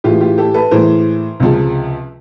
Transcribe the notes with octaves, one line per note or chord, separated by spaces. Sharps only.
A2 E3 G#3 F4 G4
F4 G4
G4 A4
A4 B4
A2 E3 G#3 A#4 C5
C#2 C3 F3 G#3